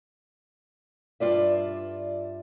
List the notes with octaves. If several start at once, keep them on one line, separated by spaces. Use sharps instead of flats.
G2 F4 D5 E5